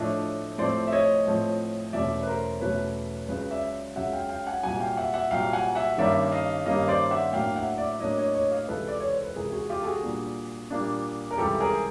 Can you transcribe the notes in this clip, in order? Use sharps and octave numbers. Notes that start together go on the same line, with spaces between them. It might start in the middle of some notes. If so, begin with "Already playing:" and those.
Already playing: A2 F3 A3 D4 C#5 D#5
A2 F3 A3 C4 C5 D5
E5
C#5 D#5
A2 F3 A3 C4
E2 B2 F#3 A3 C#4 D5 E5
B4
A#4 C5
E2 B2 F#3 A3 C#4 B4 C#5
C#2 C#3 F#3 B4 C#5
D5 E5
C#2 C#3 F#3 E5 F#5
F5 G5
F5 G5
F#5 G#5
C2 A#2 F#3 F#5 G#5
F5 G5
E5 F#5
E5 F#5
C2 A#2 F#3 F5 G5
F#5 G#5
E5 F#5
G2 D#3 G3 A#3 C#4 D5 E5
D#5 F5
G2 D#3 G3 A#3 C#4 D#5 F5
C5 D5
E5 F#5
A2 F#3 A#3 D4 F5 G5
E5 F#5
D5 E5
A2 F#3 A#3 D4 C#5 D#5
C#5 D#5
C#5 D#5
D#5 F5
C#2 C3 E3 A4 B4
D5
C#5
C5
B4
C#2 C3 E3 G#4 A#4
F#4 G#4
F4 G4
A4
F#4 G#4
A#2 G3 A#3 D4
A#2 G3 A#3 D4
A#4
C#2 C3 E3 G3 G4 A4
G#4 A#4